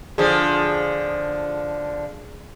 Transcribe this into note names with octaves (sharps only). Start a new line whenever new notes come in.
D3 F3 G#4